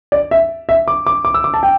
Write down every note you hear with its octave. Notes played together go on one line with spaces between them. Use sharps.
D5
E5
E5
D6
D6
D6
E6
D6
A5
G5